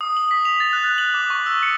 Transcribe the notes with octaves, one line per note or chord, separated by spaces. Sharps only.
D#6
F#7
B6
F7
A6
F#6
F#6
F#7
D6
C#6
E6
C#7